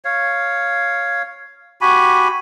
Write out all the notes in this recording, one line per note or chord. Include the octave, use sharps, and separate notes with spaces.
C#5 F5
F#4 G4 G#5 B5